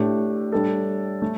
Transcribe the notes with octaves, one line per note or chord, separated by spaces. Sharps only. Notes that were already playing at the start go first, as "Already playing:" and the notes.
Already playing: A2 A3 D4 G4
G3 D4 A4
A3